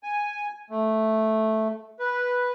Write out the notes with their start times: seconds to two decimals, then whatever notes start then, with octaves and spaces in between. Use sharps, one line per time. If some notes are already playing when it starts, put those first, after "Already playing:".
0.03 G#5
0.70 A3
1.99 B4